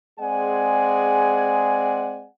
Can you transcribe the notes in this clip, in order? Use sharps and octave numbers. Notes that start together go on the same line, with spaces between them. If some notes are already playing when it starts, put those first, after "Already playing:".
G#3 C4 G#4 D5 F#5 G#5